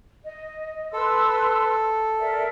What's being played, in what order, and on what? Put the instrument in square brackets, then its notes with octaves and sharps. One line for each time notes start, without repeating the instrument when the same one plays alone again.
[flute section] D#5
[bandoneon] A4 [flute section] B4 C6 E6
[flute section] A#4 D5 E5